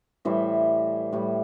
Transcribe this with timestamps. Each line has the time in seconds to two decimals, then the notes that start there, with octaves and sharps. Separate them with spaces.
0.25 A2 E3 G3 C5 E5
1.13 A2 G3